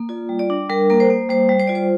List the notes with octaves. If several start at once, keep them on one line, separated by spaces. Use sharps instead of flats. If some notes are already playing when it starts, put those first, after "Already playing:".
Already playing: A#3
F4 D5
G3
D5
D4
G3 A#4
A#3 A#4
C5
A#3
G3 C5
G3
C5
F4 D5
C5